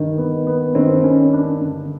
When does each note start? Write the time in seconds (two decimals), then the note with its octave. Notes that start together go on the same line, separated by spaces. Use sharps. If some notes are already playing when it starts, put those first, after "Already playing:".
Already playing: G2 D#3
0.18 B3
0.47 B3
0.75 G2 D#3 C4
1.04 C#4
1.33 D4
1.61 G2 D3